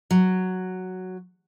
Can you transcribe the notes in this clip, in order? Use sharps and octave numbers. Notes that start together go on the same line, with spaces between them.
F#3